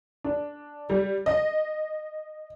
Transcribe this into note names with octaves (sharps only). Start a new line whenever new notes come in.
D4
G3
D#5